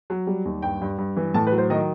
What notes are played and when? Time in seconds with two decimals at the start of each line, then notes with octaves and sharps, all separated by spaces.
0.10 F#3
0.27 G3
0.45 D#2
0.62 G2 G5
0.81 G2
0.98 G2
1.17 E3
1.34 A2 A5
1.47 B4
1.52 F#3
1.58 C5
1.70 D#3 D#5